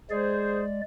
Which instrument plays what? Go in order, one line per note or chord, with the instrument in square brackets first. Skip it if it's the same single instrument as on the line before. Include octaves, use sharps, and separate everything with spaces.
[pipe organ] G#3 D5 [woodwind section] G#4 C5